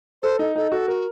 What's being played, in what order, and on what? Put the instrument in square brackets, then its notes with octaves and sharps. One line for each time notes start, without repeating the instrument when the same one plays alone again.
[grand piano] A4 [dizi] C5
[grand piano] D#4 [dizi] A4
[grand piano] D#4 [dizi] A4
[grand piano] F#4 [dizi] A4
[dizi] F#4 [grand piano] A#4